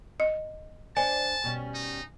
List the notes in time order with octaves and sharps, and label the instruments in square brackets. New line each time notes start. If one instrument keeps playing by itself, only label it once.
[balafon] D#5
[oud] D4 C5 D5 [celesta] G#5 [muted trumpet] A5
[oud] B2 G3 C#4
[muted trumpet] D#4